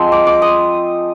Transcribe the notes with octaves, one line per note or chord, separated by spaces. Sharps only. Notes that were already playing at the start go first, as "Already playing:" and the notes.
Already playing: F3 G#3 C4 C6
D6
D6
D#6